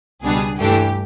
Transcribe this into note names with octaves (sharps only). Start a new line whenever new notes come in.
C#2 B2 G3 B3 D4 G#4
G2 E3 A3 D4 G4